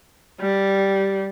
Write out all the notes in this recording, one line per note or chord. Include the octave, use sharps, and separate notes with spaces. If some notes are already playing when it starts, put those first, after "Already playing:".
G3